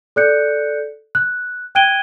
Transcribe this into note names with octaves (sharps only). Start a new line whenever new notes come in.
A4 D5 F#6 G6 C#7
F#6
G5 F#6 G#6 D7 D#7 G7